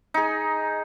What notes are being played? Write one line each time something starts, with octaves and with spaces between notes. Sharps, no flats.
D#4 G#4